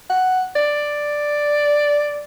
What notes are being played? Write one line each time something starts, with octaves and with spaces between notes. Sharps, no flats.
F#5
D5